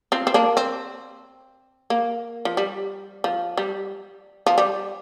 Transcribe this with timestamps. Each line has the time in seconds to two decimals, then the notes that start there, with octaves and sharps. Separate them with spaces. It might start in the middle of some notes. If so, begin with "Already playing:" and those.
0.12 C4 F4
0.27 C4
0.34 A#3 D4
0.57 C4
1.90 A#3
2.45 F3
2.57 G3
3.24 F3
3.57 G3
4.46 F3
4.58 G3